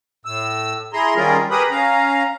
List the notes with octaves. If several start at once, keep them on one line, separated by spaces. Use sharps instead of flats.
A2 E6
E4 G#4 A#5 C6
D#3 G3 C#4 F4 G#4 A#4
G4 G#4 A#4 B4 B5 D#6
C#4 F5 A#5